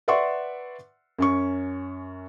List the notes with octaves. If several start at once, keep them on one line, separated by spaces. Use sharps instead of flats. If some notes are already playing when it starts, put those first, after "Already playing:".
B4 D5 E5 F#5 C6 C#6
F#2 C#4 C#6